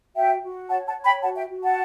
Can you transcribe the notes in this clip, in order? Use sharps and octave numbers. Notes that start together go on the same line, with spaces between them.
F#4 E5 G5
F#4
C#5 F#5 A5
F#5 A5
C#5
G5 B5
F#4 F#5 A5
E5 G5
F#4
F#5 A5